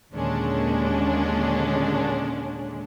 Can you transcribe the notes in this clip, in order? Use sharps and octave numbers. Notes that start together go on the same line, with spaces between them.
D#2 A#2 D3 G#3 C#4 D4